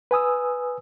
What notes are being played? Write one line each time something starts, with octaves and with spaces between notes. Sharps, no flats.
B4 G#5 D#6 E6